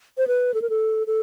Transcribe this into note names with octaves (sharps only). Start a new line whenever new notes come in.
C5
B4
A4
A#4
A4
A4